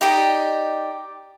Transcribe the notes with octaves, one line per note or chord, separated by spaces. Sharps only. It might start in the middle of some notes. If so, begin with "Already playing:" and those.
D#4 G4 D5 D#5